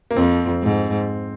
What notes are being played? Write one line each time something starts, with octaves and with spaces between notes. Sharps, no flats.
A#3
F2 C4
G#2